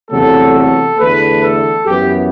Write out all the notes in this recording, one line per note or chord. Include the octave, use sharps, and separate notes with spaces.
E2 C3 F#3 A3 A4
A4
E2 D3 A3 B4
A4
F#2 E3 B3 G4